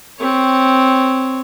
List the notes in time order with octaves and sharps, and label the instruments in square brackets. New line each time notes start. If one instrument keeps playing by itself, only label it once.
[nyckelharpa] C4 C#5